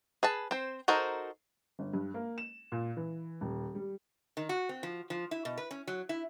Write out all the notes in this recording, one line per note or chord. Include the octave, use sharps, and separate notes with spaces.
G#4 B4 A5
C4 C5
D#4 F#4 A4 A#4 C5
G1
G2
A#3
E7
A#2
E3
D#1
G3
D#3
F#4
C4
F3
F3
E4
B2
B4
C#4
F#3
E4